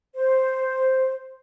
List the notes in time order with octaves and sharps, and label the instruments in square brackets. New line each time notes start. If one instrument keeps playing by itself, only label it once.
[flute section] C5